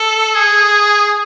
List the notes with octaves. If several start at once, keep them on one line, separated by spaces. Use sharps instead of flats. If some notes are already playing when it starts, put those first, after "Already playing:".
Already playing: A4
G#4